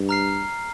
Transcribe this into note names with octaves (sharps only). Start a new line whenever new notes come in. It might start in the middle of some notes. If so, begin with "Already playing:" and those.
Already playing: G2
A#5 F6 C7